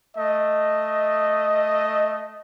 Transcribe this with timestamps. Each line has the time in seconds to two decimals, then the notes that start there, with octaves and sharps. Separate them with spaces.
0.17 A3 D#5